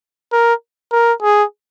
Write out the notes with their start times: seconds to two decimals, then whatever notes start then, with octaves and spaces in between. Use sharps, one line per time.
0.33 A#4
0.92 A#4
1.22 G#4